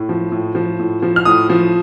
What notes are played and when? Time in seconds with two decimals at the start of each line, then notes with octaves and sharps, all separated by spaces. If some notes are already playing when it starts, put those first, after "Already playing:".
Already playing: A2
0.09 F3
0.32 A2
0.55 F3
0.80 A2
1.03 F3
1.16 F6
1.25 A2 D#6
1.50 F3